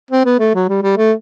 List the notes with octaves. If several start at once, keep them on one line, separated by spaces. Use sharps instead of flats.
C4
B3
A3
F#3
G3
G3
A3